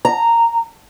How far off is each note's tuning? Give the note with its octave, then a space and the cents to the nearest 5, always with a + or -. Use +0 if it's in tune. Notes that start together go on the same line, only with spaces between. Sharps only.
A#5 -10